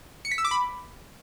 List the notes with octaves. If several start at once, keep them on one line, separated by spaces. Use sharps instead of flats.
C#7
B6
E6
D6
B5